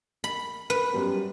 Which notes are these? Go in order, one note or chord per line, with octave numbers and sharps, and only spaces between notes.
B5
B4
F#2 G3 B3